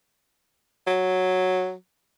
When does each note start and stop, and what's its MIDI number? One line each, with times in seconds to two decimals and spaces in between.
0.87 1.73 54